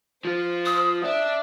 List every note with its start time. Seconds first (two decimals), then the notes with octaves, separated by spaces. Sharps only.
0.25 F3 F4 C5
0.66 D#6
1.04 D4 E5